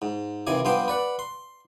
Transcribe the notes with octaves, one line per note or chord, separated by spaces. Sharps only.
G#2
D#2 C3 E3 G#5 D6
G2 F3 B3 C5 G5 D6
B4 D5 F#5
C6